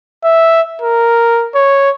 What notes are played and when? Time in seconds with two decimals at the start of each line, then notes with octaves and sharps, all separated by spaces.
0.24 E5
0.82 A#4
1.55 C#5